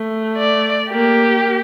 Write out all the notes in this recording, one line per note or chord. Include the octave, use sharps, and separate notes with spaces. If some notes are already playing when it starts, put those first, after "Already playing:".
Already playing: A3
D5
A#3 G4